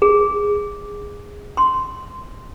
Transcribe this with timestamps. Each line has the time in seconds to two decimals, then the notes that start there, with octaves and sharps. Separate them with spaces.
0.02 G#4
1.57 C6